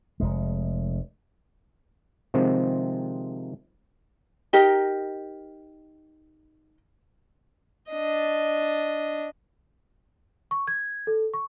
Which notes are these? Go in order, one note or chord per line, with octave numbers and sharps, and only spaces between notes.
F1 G#3
C3 D#3 F3 G#3 C4
D#4 G4 A#4 D#5
D4 D#5
C#6
G#6
A4
C#6